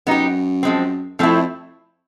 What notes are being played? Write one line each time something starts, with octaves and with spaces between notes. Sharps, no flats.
F#2 B3 D#4 G4
F3 G#3 C4
F2 F3 A3 C4 E4